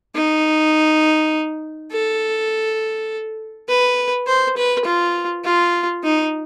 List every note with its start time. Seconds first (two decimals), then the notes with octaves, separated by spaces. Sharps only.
0.15 D#4
1.92 A4
3.69 B4
4.27 C5
4.57 B4
4.85 F4
5.44 F4
6.04 D#4